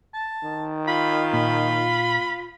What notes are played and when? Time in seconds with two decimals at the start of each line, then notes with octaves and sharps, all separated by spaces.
0.13 A5
0.43 D#3
0.87 F4 B5
1.33 A#2 B5